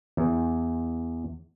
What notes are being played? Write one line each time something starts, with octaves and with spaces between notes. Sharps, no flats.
E2